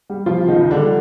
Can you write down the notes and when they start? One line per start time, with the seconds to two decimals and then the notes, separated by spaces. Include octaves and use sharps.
0.10 G3
0.26 B2 F3 F4
0.43 C#2
0.48 D#3 D#4
0.59 C#2
0.71 D3 D4
0.76 G3